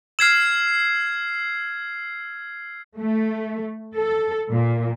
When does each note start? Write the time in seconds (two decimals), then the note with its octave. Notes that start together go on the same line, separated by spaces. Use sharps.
0.19 E6 F6 G#6 C7 E7
2.99 A3
3.96 A4
4.52 A#2